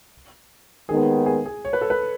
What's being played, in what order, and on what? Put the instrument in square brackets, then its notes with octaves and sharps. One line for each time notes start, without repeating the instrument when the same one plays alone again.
[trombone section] D#2 D#3 G#3 B3 [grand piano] G#4
[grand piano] G#4
G#4
C#5
B4
A4
B4